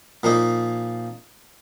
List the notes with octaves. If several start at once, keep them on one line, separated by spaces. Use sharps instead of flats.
A#2 F3 A#3 D#4